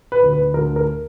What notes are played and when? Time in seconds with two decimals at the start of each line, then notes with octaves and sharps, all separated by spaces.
0.12 B4
0.23 D2
0.33 B4
0.54 D2 A#4
0.76 A#4